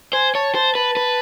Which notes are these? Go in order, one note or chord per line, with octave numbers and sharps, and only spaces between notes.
C5 G#5
C#5 A5
C5 A5
B4 A5
B4